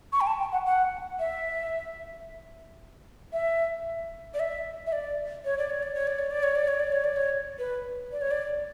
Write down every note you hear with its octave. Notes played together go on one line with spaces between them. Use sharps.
C#6
G5
A5
G5
F#5
F#5
E5
E5
D5
E5
E5
D5
C#5
D5
C#5
D5
C#5
D5
C#5
D5
C#5
D5
C#5
D5
C#5
D5
C#5
B4
D5
C#5
D5